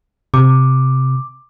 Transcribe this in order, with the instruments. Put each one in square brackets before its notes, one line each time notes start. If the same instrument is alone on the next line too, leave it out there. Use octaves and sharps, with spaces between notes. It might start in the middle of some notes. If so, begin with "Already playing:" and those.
[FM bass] C3 [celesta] D6